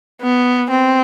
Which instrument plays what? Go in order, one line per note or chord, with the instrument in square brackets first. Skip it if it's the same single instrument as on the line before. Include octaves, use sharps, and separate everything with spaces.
[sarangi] B3
C4